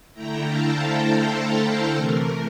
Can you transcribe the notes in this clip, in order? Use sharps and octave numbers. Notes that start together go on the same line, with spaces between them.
D3 A3 E4 G5 A#5
F5 A5
A4 C5
A4
A4
C3 E3 A3 A#4